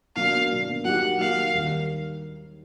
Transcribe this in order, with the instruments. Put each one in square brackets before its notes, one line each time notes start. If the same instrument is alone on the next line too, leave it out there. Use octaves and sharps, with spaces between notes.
[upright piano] B2 F#3 A#3 D4 [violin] F5
[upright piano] B2 F#3 A#3 D4
[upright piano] F#3 A#3 D#4 G4 [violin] F#5
[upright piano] F#3 A#3 D#4 G4 [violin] F5
[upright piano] D#2 D#3 G3